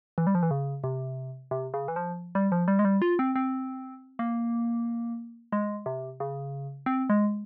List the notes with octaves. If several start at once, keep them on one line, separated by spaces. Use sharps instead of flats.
E3
G3
F3
E3
C#3
C3
C3
C#3
E3
F3
G3
F3
G3
G#3
G3
F4
C4
C4
A#3
G#3
C3
C#3
C4
G#3